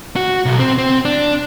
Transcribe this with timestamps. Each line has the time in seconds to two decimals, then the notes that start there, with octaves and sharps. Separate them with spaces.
0.16 F#4
0.45 B1
0.60 C4
0.78 C4
1.05 D4